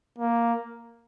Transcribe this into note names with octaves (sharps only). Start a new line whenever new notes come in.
A#3